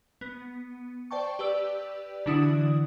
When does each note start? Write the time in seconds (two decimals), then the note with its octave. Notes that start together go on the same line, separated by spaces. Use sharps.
0.21 B3
1.11 C5 D5 G5 A5 C#6
1.39 G4 B4 D5 E6
2.26 D3 E3 D4 E4 F#4 D#6